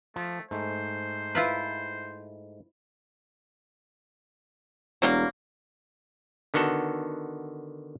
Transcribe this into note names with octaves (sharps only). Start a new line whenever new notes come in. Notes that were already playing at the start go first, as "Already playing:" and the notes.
F3 A3
G#2 A3 C5
E4 F4 B4
E1 F#3 G3 A#3
D3 D#3 B3 F#4 A4